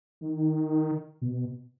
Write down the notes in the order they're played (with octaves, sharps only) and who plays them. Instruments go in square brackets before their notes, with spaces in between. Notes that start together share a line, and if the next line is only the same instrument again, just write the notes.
[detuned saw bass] D#3
B2